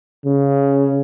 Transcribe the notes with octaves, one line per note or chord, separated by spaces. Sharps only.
C#3